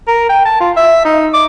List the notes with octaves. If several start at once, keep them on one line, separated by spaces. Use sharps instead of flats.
A#4
G5
A5
F4
E5
D#4
D6